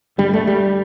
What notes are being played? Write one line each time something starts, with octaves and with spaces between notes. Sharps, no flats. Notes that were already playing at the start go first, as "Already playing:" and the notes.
G2 D3 G3
A3
G3